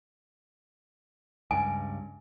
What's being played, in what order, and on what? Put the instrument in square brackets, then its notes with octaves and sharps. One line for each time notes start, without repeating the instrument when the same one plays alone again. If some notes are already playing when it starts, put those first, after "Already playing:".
[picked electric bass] C#2 G2 [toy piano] G#5